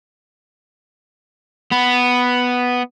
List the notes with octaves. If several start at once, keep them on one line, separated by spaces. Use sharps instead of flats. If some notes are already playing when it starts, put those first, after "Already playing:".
B3